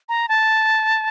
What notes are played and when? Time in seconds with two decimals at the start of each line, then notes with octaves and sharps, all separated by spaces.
0.09 A#5
0.29 A5